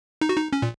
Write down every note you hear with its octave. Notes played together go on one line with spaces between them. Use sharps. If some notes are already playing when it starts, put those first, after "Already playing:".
D#4
F#4
D#4
C#4
A#2